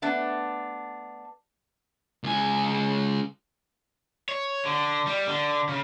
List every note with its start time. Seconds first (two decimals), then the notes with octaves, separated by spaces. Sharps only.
0.02 A3 B3 D4
2.24 C#2 G#5
4.29 C#5
4.65 D3
5.07 G3
5.27 D3
5.69 C#3